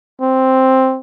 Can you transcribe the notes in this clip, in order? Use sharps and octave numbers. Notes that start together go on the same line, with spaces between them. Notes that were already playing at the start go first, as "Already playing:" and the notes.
C4